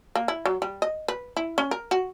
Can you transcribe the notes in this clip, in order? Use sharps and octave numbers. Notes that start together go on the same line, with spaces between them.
A#3
E4
F#3
G3
D#5
B4
E4
C#4
A#4
F#4